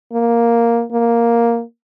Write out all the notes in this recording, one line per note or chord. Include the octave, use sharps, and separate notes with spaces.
A#3
A#3